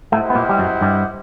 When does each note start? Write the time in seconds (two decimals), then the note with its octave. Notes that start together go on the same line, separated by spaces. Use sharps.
0.12 A2 A3 E4 G4 C5 D#5 F#5
0.30 B3
0.35 A#2 A#3
0.49 G3
0.59 F#2 F#3
0.81 G2 G3